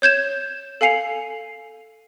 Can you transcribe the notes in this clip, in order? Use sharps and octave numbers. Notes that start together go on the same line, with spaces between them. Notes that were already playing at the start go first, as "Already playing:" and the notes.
C#5 G6 G#6 E7
A4 F5 G#5 C7 C#7 F7